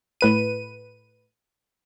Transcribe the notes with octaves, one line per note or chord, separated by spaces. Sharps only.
A2 B4 D#7